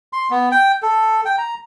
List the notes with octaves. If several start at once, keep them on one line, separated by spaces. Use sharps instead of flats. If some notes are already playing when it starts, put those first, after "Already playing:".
C6
B3
G5
A4
G5
A#5